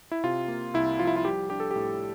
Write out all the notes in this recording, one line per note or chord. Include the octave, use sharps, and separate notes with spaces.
E4
C3 F4
A#3
C2 E4
F3 F4
E4
F4
G3 G4
D4 G4
A4
G4
A2